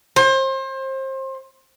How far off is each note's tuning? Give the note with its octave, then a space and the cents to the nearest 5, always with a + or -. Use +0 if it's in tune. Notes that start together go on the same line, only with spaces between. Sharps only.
C5 +30